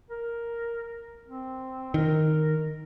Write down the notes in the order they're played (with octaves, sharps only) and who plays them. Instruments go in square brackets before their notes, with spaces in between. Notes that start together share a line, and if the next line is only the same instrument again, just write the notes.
[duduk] A#4
C4
[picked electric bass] D#3 [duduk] A#4